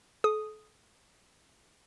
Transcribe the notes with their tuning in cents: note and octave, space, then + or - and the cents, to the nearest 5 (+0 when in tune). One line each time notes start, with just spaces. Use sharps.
A4 -35 D#6 +0